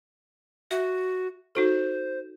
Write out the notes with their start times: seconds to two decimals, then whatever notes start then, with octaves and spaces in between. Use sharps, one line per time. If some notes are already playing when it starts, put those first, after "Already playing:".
0.71 F#4 E5
1.55 D#4 F#4 A4 C5